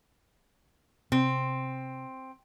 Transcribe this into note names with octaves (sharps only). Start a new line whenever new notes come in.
C3 C4